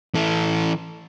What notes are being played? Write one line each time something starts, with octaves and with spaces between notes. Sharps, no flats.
E3 A4